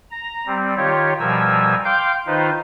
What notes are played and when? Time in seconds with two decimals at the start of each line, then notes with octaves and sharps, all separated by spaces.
0.11 A#5
0.47 G3 C4
0.77 D#3 F4 G4 C#5
1.20 B2 F3 G3 A#4 G#5 E6
1.85 F5 G5 C6 D6 G6
2.27 D#3 D#4 F4 B4 C5